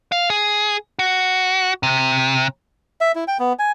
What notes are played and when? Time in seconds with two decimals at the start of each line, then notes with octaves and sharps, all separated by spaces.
0.12 F5
0.30 G#4
0.99 F#4
1.83 C3
3.01 E5
3.15 E4
3.28 G5
3.40 B3
3.59 G#5